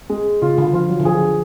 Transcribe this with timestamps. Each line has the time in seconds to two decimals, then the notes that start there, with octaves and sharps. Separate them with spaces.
0.10 G#3
0.42 C#3 F4
0.58 D3
0.73 F3 F4
0.89 F#3
1.00 D3
1.05 F3 G#4